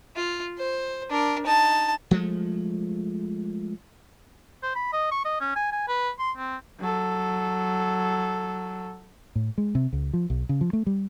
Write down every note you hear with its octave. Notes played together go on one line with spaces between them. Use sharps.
F4
C5
D4 A#4
D#4 A5
F3 G#3 A3
C5
B5
D#5
C#6
D#5
C#4
G#5
G#5
B4
C6
C4
F#3 A4
A2
G#3
C3
C#2
F3
B1
C#3
F3
A3
G3